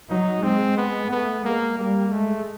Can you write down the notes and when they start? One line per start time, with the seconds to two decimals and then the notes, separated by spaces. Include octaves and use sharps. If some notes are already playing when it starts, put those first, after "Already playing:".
0.09 F#3 D#4
0.43 G#3 C4
0.77 B3
1.11 A3 B3
1.45 G#3 A#3
1.78 G3 A#3
2.12 G#3 A3